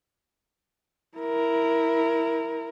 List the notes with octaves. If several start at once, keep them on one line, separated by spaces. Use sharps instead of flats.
E4 A#4